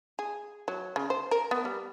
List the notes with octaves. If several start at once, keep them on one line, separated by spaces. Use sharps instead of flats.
G#4
F#3
C#3
C5
A#4
B3
G3